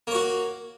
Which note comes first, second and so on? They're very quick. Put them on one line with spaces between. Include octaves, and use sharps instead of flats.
A#3 C#5 F#4